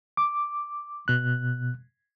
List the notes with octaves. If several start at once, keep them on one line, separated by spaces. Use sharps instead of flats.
D6
B2 F#6